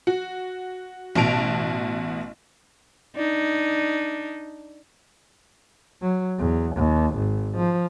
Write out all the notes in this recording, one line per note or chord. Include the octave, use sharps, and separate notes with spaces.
F#4
A1 B2 A5 D7 F7
D4 D#4
F#3
E2
D#2
G#1
F3